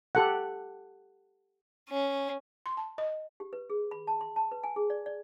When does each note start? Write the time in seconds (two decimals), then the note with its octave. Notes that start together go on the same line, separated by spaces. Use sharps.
0.15 G4 A4 F#5
1.89 C#4
2.66 C6
2.77 A5
2.98 D#5
3.40 G4
3.53 B4
3.70 G#4
3.91 B5
4.07 A5
4.21 C6
4.36 A5
4.52 B4
4.64 G#5
4.76 G#4
4.90 D5
5.06 D5